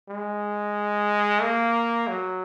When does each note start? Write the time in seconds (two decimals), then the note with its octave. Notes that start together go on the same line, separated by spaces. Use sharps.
0.09 G#3
1.42 A#3
2.08 F#3